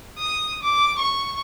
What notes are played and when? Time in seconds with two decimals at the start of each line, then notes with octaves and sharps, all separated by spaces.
0.19 D#6
0.63 D6
0.99 C#6